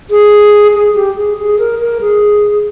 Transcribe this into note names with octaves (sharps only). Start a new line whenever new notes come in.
G#4
G#4
G4
G#4
G#4
A#4
A#4
G#4